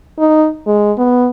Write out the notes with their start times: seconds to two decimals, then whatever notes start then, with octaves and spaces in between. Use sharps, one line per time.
0.19 D#4
0.67 G#3
0.98 B3